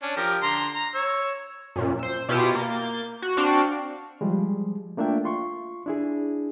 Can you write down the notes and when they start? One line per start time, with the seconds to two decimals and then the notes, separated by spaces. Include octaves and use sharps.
0.02 C#4 D4
0.17 F3 G4 A#4
0.42 D3 A#5 C6
0.75 A#5
0.95 C#5 E6
1.76 F#2 A#2
1.99 C5 E6
2.29 B2 E4 F4 G4 D#6 C#7
2.53 A#3 G6 A6
3.22 F#4
3.37 C4 D4 F#4 F5 G5
4.21 F3 G3 G#3
4.97 A3 A#3 D4 F4 E5 G5
5.24 F4 C6 C#6
5.86 D4 E4 G#4